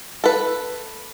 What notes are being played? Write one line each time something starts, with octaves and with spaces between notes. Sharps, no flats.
A4 B4